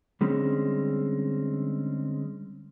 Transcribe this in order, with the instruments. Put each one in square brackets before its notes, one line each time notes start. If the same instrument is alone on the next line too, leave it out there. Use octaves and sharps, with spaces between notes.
[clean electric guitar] D3 G3 G#3 C4 C#4